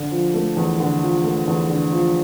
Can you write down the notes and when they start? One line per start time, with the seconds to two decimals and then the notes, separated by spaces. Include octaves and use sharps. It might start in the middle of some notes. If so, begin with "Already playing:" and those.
Already playing: D3
0.12 F3
0.34 A3
0.57 E2
0.80 D3
1.02 F3
1.24 A3
1.47 E2
1.70 D3
1.92 F3